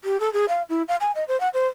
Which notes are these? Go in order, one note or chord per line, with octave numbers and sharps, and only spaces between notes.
G4
A4
G#4
F5
E4
F5
G#5
D#5
C5
F#5
C5